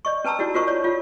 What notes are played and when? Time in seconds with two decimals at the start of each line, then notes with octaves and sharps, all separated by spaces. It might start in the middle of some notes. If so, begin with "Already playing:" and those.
0.05 D5 D#5 C#6
0.25 C#4 B4 A5 A#5 E6
0.39 D#4 E4 F#4 D5
0.54 F4 F#4 A#4 C5 D#5 C#6
0.67 C#5 D5
0.84 F4 F5